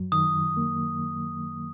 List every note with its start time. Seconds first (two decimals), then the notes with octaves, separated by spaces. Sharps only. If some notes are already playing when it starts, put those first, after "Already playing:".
Already playing: F#2 F#3
0.12 D#3 D#6
0.57 A#3